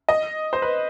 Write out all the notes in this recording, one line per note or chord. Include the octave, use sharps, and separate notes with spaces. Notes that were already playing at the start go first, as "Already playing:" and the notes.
D#5
C5
B4